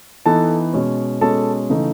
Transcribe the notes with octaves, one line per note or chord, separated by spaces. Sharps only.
E3 B3 D#4 A4 A5
B2 G#3 C#4
B2 G#3 C#4 A4 A5
C#3 E3 A3 D#4